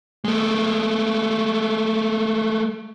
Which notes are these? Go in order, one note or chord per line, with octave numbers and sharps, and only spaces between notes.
G#3 A3